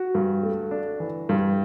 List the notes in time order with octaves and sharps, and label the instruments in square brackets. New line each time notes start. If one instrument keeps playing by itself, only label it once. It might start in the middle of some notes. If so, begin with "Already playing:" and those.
Already playing: [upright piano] F#4
[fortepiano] G2
A3
D4
E3
G2